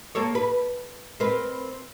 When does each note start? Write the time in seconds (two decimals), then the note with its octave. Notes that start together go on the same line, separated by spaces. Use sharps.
0.15 A#3 A4 C#5
0.35 B4
1.20 C4 A#4 B4